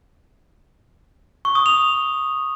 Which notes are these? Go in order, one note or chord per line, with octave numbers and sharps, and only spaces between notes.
C#6
D#6
F7